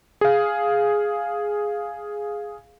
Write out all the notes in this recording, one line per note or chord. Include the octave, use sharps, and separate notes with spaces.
G#4 F5